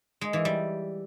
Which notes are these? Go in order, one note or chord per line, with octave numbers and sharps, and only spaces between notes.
G#3
E3
G3